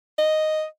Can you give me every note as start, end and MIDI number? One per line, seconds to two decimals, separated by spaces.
0.18 0.65 75